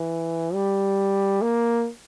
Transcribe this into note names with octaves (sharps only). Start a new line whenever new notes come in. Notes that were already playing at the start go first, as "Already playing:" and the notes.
Already playing: E3
G3
A#3